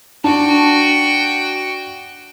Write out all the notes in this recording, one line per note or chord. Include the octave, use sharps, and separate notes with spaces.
D4 F#4 G5 A5